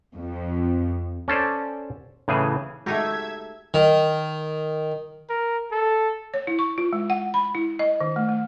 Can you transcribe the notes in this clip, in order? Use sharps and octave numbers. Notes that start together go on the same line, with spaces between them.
F2
C#4 A4 C5 D5
A2 C#3 E3 G#4 G#5
G#3 A3 D#4 F#4 G4 E5 A#5 G#6
D#3
A#4
A4
C#5
E4
C#6
F4
G#3
F#5
B5
E4
D#5
D#3
A3
A3